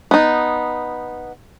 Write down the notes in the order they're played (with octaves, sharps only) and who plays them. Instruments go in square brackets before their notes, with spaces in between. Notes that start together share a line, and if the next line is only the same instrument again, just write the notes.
[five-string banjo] B3 D#4